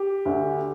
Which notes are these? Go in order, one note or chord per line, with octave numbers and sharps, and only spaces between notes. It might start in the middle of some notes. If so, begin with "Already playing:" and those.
Already playing: G4
D2 D3